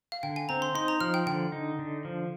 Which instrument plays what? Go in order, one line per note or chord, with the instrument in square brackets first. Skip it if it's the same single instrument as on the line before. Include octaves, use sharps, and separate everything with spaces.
[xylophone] F5
[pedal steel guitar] D3 [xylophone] G5
[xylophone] G#5
[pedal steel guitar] C4 [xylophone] A#5
[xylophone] C6
[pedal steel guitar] D#4 [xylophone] C6
[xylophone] A#5
[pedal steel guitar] F3 [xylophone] F6
[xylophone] G5
[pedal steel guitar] D3 [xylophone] G5
[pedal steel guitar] D#4
D3
F3